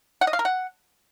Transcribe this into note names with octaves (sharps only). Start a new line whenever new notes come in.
F#5
D#5
F5
A#4
F#5